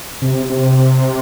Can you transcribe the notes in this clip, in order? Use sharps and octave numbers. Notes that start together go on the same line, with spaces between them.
C3
C3